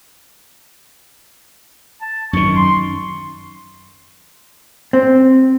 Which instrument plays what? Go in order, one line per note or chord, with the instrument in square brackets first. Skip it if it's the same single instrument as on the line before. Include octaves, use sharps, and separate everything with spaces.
[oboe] A5
[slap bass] F#2 D#3 [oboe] C#6
[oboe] C6
[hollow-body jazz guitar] C4